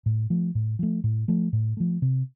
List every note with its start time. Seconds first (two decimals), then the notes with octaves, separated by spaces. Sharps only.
0.06 A2
0.30 F3 A3
0.55 A2
0.79 F3 A3
1.04 A2
1.28 F3 A3
1.53 A2
1.77 F3 A3
2.02 C3